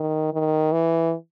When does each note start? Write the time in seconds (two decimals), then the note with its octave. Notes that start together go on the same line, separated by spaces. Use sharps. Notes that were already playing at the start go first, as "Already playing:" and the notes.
Already playing: D#3
0.33 D#3
0.72 E3